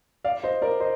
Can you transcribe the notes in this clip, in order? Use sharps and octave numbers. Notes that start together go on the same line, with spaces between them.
D5 F5
C5 D#5
A#4 D5
C5 D#5